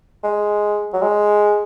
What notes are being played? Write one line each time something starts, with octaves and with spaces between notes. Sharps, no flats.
G#3
F#3
G#3